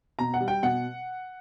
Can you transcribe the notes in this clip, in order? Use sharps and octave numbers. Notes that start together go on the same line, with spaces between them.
B2 A#5
F#5
G3
G5
B2 F#5